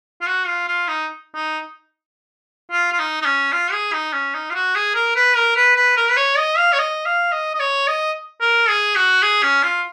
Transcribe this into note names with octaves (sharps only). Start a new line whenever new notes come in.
F4
F#4
F4
F4
D#4
D#4
F4
F4
D#4
D#4
C#4
F4
G#4
D#4
C#4
D#4
F4
F#4
G#4
A#4
B4
A#4
B4
B4
A#4
B4
C#5
D#5
F5
C#5
D#5
F5
D#5
D#5
C#5
D#5
A#4
G#4
F#4
G#4
C#4
F4